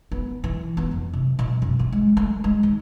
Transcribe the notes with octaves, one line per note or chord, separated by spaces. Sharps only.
B3
E3
B3
F2
C3
B2
F#2
F#2
G#3
A3
G#3
D#3